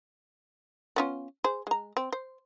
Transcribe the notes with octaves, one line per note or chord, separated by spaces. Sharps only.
B3 C#4 F4
G#4 C5
G#3 A#5
C4
C5